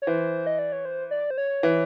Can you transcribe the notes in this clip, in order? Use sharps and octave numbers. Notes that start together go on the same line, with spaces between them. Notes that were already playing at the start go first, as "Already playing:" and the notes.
C#5
E3 C5
D#5
D5
C#5
C5
D5
C5
C#5
E3